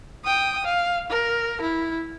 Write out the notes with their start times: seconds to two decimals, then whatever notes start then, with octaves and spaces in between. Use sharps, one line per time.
0.24 G5 D#6
0.65 F5
1.10 A#4
1.62 E4